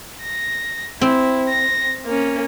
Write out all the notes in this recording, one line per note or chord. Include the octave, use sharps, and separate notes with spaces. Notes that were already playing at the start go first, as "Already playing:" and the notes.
A#6
C4 E4
A#6
A#3 C#4